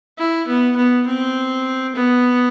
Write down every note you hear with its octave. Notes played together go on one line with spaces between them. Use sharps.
E4
B3
B3
C4
B3